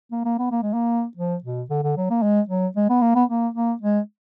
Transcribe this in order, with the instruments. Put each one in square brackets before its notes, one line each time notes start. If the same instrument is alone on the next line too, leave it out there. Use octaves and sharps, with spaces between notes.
[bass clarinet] A#3
A#3
B3
A#3
G#3
A#3
F3
B2
D3
D3
F#3
A#3
G#3
F#3
G#3
B3
A#3
B3
A#3
A#3
G#3